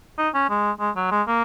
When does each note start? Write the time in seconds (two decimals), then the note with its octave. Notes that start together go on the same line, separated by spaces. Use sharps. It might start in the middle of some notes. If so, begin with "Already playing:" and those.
0.18 D#4
0.34 C#4
0.49 G#3
0.80 G#3
0.96 F#3
1.11 G#3
1.27 A#3